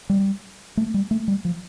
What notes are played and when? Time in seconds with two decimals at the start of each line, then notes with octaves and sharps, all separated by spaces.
0.10 G3
0.77 A3
0.94 G3
1.11 A3
1.28 G3
1.45 F3